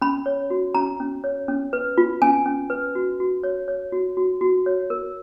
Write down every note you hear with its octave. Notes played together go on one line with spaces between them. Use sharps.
C#4 B5
C#5
F#4
C#4 A#5
C#4
C#5
C#4
B4
F4
C#4 G#5
C#4
B4
F#4
F#4
C#5
C#5
F#4
F#4
F#4
C#5
A#4